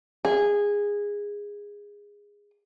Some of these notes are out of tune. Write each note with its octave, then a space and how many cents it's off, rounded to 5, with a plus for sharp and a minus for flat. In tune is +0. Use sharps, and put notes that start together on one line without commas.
G#4 -15